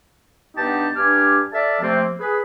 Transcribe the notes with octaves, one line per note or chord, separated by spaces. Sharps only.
G2 B3 D4 D#4 G4 A5
G2 D4 G4 G#5 D6 F6
A4 D5 E5 F5 A5
C3 F3 A3 A#3 C4
G#4 B4